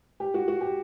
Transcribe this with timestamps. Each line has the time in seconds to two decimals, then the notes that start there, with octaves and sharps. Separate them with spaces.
0.20 G4
0.34 F#4
0.48 F#4
0.61 G4